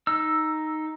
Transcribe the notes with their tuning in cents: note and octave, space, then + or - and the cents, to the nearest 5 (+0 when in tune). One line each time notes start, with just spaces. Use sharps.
D#4 +0 E6 +0